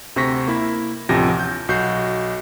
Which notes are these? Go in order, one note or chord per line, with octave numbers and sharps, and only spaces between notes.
D2 C3 C5 C#6 A#6 B6
A#3 E4
A1 D2 C3 F3 G4 A#6
G6
B1 F#4 G6 C7